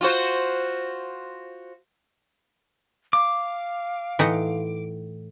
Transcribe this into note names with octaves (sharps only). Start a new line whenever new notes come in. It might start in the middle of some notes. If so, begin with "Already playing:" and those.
F4 F#4 C5
F5 D6
A2 E3 D#4 F#5 C6